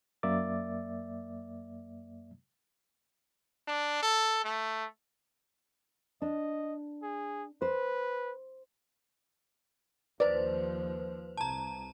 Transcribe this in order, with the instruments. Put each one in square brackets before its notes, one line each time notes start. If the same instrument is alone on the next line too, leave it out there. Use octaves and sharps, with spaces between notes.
[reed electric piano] F#2 A#3 D5 E5 D6 A6
[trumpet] D4
A4
A3
[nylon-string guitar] D4 [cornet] D#5
[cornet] G#4
[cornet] B4 [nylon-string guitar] C5
[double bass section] D#2 F3 [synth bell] B4 C5 [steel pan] D5
[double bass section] C2 [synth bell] A5 A#5